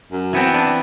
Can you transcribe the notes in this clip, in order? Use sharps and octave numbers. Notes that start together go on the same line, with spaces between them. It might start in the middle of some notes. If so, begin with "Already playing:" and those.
F#2
E3 B3 C4
D4